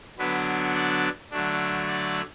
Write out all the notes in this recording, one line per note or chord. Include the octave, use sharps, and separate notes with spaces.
D3 F#3 B3 D4 B4
D5
D3 F#3 A3 D4
D5